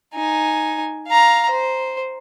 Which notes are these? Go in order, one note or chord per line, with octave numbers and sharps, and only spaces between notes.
D#4 G#5
F5 A#5
C5